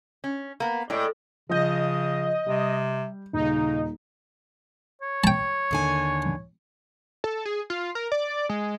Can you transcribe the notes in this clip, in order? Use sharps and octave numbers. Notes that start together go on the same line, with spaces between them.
C#4
A#3 B3
A2 G#3 D5 G5
C#3 F3 D#5 G6
C3 G3
D#1 C#3 D#4
C#5
G5 A5
D#2 D3 G#5
A4
G#4
F4
A#4
D5
G#3